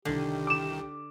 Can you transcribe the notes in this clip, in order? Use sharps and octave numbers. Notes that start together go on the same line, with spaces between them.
C2 D3 D#3 G4
D6 E7